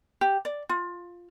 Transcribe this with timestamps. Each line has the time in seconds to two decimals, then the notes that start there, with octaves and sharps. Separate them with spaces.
0.21 G4
0.45 D5
0.69 F4